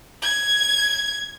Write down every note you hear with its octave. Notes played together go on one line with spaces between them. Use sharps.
G#6